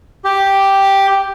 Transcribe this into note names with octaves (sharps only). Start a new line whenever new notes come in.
G4